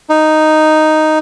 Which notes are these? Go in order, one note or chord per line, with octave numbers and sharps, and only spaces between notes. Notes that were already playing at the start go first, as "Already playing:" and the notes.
D#4